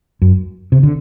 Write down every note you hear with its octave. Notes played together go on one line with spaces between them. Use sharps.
F#2
C3
D3